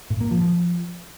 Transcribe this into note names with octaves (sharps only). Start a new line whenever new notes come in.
A2
A#3
F3
F3